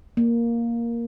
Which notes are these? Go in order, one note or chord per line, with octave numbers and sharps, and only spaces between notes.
A#3